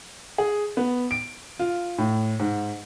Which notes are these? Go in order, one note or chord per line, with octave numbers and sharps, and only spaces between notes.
G#4
B3
D7
F4
A2
G#2